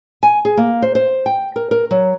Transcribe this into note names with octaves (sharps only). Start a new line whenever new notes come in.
G#5
G#4
A#3
C5
C5
G5
A#4
A#4
F#3